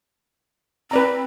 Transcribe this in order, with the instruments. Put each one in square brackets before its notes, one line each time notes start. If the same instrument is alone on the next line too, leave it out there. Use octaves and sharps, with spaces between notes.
[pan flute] C4 [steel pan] B4 D5 A#5